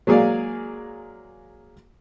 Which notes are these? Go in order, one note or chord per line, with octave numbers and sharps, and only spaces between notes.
F#3 G#3 A#3 G#4 D5 F5